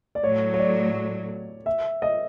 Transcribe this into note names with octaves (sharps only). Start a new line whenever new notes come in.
D5
A2 F#3 A3 C#5
C#5
D5
E5
D#5